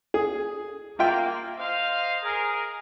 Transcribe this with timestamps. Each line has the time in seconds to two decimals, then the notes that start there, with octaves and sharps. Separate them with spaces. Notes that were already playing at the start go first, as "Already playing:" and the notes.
0.14 G#4
0.99 A#3 F4 E5 G5
1.58 C5 D#5 F5
2.23 G#4 A#4